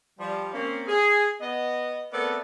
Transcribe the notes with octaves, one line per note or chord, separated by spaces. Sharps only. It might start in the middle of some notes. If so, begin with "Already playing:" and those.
F3 G3
A#3 C4 C#4
G#4
B3 D#5
A3 B3 C4 A4 A#4 D5